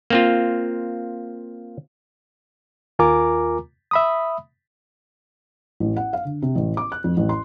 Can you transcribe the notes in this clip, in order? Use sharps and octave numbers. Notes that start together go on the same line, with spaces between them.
A#3 C4 F4
D#2 F4 A#4 G#5 A#5 D6
E5 B5 D#6
A1
F#5
F5
D3
C3
A1
D6
F#6
F2
A1
C6